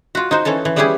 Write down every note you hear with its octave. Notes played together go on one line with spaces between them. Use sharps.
F4 F#4
D#4 F#4 C5
E3 C#4 A4 A5
E3
G3 B3 C#4 E4 G4 G#4